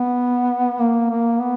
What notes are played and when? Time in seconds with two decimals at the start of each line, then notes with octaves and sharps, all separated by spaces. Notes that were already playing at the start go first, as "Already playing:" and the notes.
Already playing: B3
0.79 A#3
1.10 A#3
1.40 B3